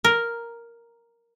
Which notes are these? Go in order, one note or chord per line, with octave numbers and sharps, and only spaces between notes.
A#4